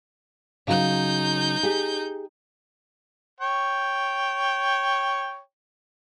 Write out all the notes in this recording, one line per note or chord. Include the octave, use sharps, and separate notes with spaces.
C#3 F#3 D#4 G6
G4 G#4
C#5 G5